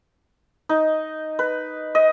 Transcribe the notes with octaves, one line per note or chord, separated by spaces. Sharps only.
D#4
B4
D#5